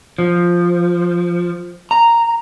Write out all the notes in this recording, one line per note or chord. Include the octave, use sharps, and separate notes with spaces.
F3
A#5